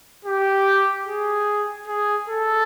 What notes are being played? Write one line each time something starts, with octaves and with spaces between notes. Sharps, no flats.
G4
G#4
G#4
A4